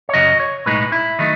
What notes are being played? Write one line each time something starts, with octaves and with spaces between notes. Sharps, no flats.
C#5
F#2 C#3 F#3 C#4 D#5
C#5
B1 A2 G#3 D#4 B4
E4
D#3 F#3 A3 D#4